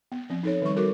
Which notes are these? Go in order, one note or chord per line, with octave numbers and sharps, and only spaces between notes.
B3
F3 C4
D#4 A4 C#5
D#3 G3 C#6
F#4 A4 A#4 D6